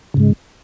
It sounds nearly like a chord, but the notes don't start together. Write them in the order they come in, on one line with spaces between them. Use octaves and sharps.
C#3 G#2 G#3